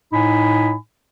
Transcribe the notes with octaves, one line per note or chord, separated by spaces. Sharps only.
A2 D#4 G#5 B5